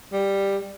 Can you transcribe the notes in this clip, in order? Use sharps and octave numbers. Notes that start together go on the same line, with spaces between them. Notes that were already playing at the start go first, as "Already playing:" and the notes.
G3